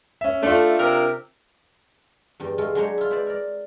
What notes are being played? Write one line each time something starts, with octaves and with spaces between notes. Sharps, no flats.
C#4 E5
A3 D4 F4
C3 A#4
E2 G2 G5
G#3 A3 F4
F#3 G#3 D4 D#4 C5 C#5
E4 F4
E4 B4 C5 D5
A#4 D5